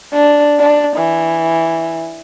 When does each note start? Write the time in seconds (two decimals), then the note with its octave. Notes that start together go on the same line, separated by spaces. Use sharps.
0.14 D4
0.59 D4
0.96 E3